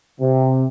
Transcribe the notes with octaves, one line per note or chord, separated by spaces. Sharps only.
C3